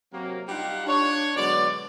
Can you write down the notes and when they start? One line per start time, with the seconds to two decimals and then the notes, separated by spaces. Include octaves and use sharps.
0.13 C3 F#3 A#3
0.48 G3 D#4 F4 G4 F5 F#5
0.86 D4 C#5
1.36 B2 D3 F#3 G#3 D5